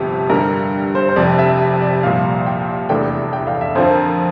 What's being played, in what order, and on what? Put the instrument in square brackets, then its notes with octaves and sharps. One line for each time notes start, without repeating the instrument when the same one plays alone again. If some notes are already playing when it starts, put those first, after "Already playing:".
Already playing: [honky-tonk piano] G1 F2 C3 F3
[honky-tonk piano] G2 D3 G3 [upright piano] A#4
[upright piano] C5
C5
[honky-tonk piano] F1 F2 C3 [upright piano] D5
[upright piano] E5
D5
[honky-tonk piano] C2 A#2 F3 [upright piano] F5
[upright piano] A#5
G5
[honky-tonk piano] F1 E2 E3 A3 D4 [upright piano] G5
[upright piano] G5
F5
E5
[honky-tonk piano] F2 D3 F3 C4 F4 [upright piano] C5
[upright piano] A#4